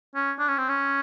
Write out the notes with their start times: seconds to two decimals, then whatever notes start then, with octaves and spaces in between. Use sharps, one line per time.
0.15 C#4
0.39 D4
0.48 C#4
0.58 C4
0.69 C#4